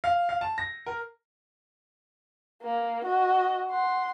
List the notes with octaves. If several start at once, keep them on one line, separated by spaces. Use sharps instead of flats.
F5
F5
A5
A#6
A#4
A#3
F#4 D#5
F#5 C6